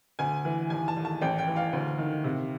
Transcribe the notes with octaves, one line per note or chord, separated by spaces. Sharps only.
D2 G#5
E3
D#2 G#5
A5
D#2
A5
A1 G5
G5
E3
F5
D2
D#3
C3